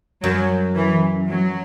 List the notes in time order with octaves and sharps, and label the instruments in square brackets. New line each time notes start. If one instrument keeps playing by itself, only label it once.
[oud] F#2 [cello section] F#3
[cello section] E3
F#3